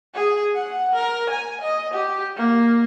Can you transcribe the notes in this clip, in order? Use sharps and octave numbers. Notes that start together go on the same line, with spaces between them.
G#4
F#5
A#4
G#5
D#5
G4
A#3